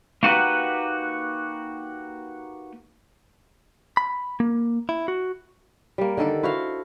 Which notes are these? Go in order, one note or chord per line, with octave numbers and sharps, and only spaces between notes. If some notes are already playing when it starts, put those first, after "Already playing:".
A#3 D#4 F#4 G4 B4 F#5
B5
A#3
E4
F#4
G3 A#3
D3 D#3 A4 D5
E4 F#4 C5 F5